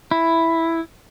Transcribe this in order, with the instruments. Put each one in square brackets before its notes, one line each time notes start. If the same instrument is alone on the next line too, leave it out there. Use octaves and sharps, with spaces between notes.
[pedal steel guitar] E4